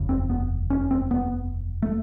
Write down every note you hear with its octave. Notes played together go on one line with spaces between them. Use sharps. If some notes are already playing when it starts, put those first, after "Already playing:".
Already playing: F1 D#2 C#3
C4
B3
C#4
C4
B3
A3